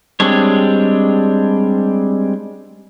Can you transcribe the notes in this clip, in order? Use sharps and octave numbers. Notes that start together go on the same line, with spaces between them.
G3 G#3 C4 D4 C#5